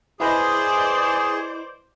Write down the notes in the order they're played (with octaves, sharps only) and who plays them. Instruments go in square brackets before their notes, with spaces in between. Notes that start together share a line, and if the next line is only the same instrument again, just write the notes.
[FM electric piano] E4 B4 D#5 [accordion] G#4 [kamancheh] C5 D5